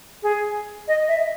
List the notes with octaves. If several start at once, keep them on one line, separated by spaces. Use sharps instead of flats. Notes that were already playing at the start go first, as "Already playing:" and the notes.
G#4
D#5
E5